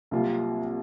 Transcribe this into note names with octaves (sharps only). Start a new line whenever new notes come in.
C2 C3 F#3 A#3 F4